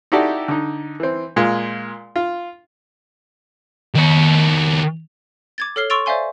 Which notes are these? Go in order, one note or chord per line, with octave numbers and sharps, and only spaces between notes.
D#4 E4 F#4 G4 A4 D5
D3 D#4
E3 C4
A#2 G#3 F4
F4
D#3 C#5
D6 G#6 A6
A4 C#5 F6 C7 G7
C6 C#6 E6 A6 D7 F7
C5 D5 E5 F5 G#5 C6